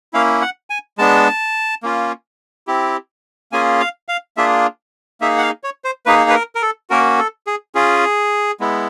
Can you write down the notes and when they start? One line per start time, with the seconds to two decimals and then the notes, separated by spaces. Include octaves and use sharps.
0.13 A#3 C#4 E4 F5
0.41 F#5
0.70 G#5
0.98 G#3 B3 D4 A5
1.83 A#3 C#4 F4
2.67 C4 E4 G4
3.52 A#3 C#4 F4 G#4 G#5
3.80 F5
4.08 F5
4.37 A#3 D4 F4 G#4 E5
5.21 A#3 D#4 G#4 E5
5.38 F#5
5.43 F5
5.64 C#5
5.85 C5
6.06 A#3 D#4 G#4 B4
6.30 B4
6.34 A#4
6.55 A#4
6.62 A4
6.90 A#3 C#4 F#4 A#4
7.19 A4
7.47 G#4
7.75 C#4 F4 G#4
8.60 G#3 B3 E4